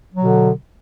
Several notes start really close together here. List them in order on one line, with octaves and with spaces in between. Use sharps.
F#3 B2 D3